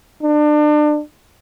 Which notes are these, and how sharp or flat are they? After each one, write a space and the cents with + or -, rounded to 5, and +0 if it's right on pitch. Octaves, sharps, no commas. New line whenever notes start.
D4 +30